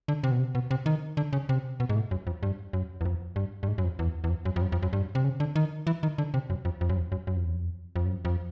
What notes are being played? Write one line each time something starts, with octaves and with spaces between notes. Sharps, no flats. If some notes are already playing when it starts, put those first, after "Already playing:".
D3
C3
B2
C3
B2
C3
D#3
D3
C#3
C3
B2
G#2
A2
F#2
F2
G2
F#2
E2
F2
G2
G2
G#2
F#2
F2
E2
E2
F2
F#2
F2
F#2
F2
F#2
G2
C3
C#3
D3
D#3
E3
D#3
D3
C3
F#2
F2
F2
F#2
F2
F#2
F#2
F2
E2
F2
F2
F#2
F2